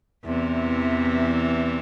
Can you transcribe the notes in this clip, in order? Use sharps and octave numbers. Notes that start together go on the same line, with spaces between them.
E2 C3 E3